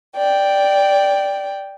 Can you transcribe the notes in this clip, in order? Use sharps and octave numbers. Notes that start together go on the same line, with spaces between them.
D5 G5